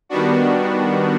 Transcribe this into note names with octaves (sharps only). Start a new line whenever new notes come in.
D#3 G3 B3 D4 F#4